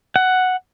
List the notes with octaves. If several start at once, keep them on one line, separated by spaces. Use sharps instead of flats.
F#5